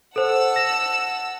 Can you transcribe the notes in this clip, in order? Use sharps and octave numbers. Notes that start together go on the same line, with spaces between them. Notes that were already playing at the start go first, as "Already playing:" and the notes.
A4 C5 F#5 A5 E6
A#6